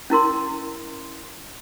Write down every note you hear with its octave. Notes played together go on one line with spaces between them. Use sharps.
C#4 E4 A#4 C6